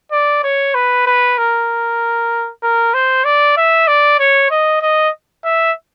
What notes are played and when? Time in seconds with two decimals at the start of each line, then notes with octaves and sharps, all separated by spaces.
0.12 D5
0.43 C#5
0.75 B4
1.07 B4
1.38 A#4
2.63 A#4
2.94 C5
3.24 D5
3.57 E5
3.88 D5
4.19 C#5
4.51 D#5
4.82 D#5
5.44 E5